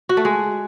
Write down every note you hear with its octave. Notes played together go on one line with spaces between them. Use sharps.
F#4
A3
G#3